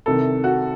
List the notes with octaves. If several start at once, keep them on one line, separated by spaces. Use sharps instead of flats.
C2 C3 D#3 A4
F#4